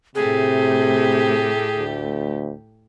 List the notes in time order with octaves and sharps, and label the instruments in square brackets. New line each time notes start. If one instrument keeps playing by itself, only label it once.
[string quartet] A2 A3 G4 [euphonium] C3 [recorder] G#4
[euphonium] D2